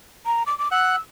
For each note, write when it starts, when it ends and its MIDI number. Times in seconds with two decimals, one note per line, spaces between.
0.26 0.43 82
0.46 0.57 86
0.59 0.71 86
0.71 0.96 78
0.71 0.98 88
0.71 0.96 90